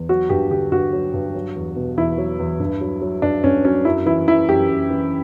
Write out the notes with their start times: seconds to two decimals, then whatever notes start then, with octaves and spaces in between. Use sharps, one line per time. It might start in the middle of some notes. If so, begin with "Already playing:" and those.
Already playing: E2
0.09 F#3 F#4
0.29 G2 G4
0.51 D3 G4
0.71 G2 F#4
0.93 F#3
1.13 G2
1.35 F#3
1.56 E2
1.76 B2
1.97 E2 E4
2.18 F#3
2.39 E2
2.60 G2
2.81 F#3
3.02 F#3
3.22 G2 D4
3.44 G2 C#4
3.65 F#3 C#4
3.85 F#2 E4
4.06 E3 E4
4.27 E3 E4
4.48 F#2 G4
4.69 F#2
4.90 E3